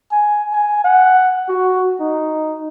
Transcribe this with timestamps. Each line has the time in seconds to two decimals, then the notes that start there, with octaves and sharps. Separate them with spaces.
0.11 G#5
0.53 G#5
0.84 F#5
1.49 F#4
2.00 D#4